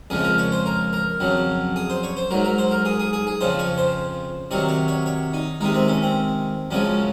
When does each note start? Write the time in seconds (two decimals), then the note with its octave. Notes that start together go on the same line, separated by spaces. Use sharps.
0.10 F2 C#3 F3 G#3 G#4
0.24 A#4
0.38 C#5
0.52 C5
0.66 A#4
0.93 A#4
1.20 F2 C#3 F#3
1.76 G#4
1.90 C5
2.03 C#5
2.17 C5
2.30 G#2 F#3 A#4
2.45 A#4
2.58 C5
2.71 A#4
2.85 G#4
3.00 G#4
3.13 G#4
3.27 G#4
3.41 F2 C#3 F3 C5
3.59 C#5
3.78 C5
4.51 C3 D#3 F#3 C#5
4.69 C#5
4.88 C#5
5.06 C#5
5.33 D#4
5.61 C3 D#3 G#3 D#4
5.74 C4
5.88 C#4
6.02 C4
6.71 F#2 C#3 F3 G#3 C#4